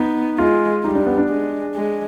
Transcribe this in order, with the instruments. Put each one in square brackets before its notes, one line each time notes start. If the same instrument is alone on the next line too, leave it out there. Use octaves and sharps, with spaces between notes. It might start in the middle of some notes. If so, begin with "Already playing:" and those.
Already playing: [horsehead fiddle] B3 [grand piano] D#4
[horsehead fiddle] G#3 [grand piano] F4
[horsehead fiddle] G3 [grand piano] D#4
[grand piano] D4
B3
D4
[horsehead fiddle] G#3
G#3